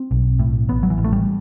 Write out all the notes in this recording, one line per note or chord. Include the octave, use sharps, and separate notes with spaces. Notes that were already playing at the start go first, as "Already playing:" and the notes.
Already playing: C4
B1
A2
A1 B3
F#3
E3
A1
A3
G3